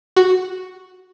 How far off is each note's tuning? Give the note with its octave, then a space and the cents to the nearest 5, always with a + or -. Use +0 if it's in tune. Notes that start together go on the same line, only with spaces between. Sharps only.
F#4 +0